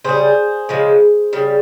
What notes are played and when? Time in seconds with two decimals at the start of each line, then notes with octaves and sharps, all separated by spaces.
0.04 C#3 G3 G#4 C5
0.69 C#3 F3 G#3
1.33 C#3 G3